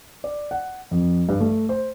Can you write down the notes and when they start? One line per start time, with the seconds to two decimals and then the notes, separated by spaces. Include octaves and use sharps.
0.24 D5
0.51 F#5
0.91 F2
1.29 G2
1.40 A3
1.69 C5